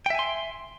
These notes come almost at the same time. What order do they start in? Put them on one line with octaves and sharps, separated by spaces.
G5 E5 G#5 C6